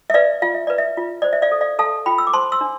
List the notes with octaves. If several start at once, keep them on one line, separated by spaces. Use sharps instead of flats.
E5
B4 D5 F5
F4 F5
E5
B4 D5
E5
F4
C5 D5
E5
D5 F5
A4
D5 F5
A4 F5 A5
F4 G5 B5
E6
D6
C5 A5 C6
C6 E6
D4